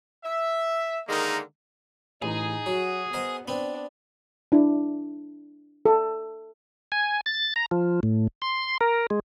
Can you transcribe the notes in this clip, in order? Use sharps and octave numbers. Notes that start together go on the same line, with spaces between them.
E5
D3 D#3 G#3 A#3 D#4
A1 D#4 G#4
F#3 F#4
B3 A#4 C5 D#5
B3 C4 D4
D4 E4
A4
G#5
A6
A#5
F3
A2
C6
A#4
G#3